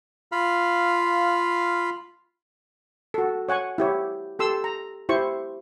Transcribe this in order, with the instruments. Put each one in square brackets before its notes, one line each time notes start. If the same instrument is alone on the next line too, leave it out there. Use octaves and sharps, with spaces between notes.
[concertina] F4 F5 B5
[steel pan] F#4 A4
C#5 F#5 G#5 C#6
E4 G4 C#5
G4 A4 C6 E6
A#5
E4 G4 C5 C#6